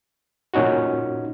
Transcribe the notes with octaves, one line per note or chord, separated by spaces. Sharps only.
A#2 C#4 D#4 F#4